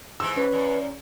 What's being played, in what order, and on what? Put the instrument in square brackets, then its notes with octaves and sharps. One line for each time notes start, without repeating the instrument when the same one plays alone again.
[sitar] G#2 E3 B3 [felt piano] E6
[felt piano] C#4 [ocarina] B4
[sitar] E2